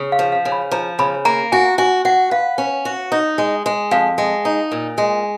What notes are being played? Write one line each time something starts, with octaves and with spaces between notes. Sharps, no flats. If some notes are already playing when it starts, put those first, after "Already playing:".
Already playing: C#3
F5
F3
F5
C#3
B5
F3 A#5
C#3 B5
A#3 A#5
F#4 G#5
F#4 G#5
F#4 F#5
B4 F5
C#4
F#4
D#4
G#3
G#3
F2 F5
G#3
D#4
A#2
G#3